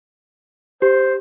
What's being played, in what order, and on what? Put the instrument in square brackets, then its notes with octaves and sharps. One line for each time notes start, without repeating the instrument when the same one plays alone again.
[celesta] G4 [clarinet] C5